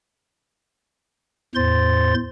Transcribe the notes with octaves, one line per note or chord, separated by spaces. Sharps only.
E2 A2 C5 C6 A6